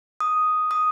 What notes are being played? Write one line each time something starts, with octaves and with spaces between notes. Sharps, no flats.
D#6
D#6